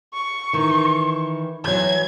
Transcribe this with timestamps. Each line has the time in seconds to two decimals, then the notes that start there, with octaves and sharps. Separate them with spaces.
0.14 C#6
0.53 D#3 E3
1.64 E3 F#3 G#6